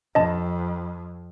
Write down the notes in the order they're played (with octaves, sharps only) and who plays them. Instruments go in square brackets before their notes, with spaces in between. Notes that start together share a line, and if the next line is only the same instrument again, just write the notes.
[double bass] F2 [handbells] D#5 A5